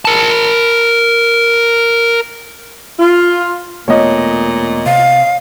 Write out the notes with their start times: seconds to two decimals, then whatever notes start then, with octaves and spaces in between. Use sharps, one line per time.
0.05 A#4 A5
3.00 F4
3.88 E1 A#2 A3 B3 C#5 D#5
4.86 C3 F5